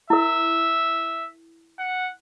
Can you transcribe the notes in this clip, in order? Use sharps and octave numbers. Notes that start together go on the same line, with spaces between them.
E4 A#4 E5
F#5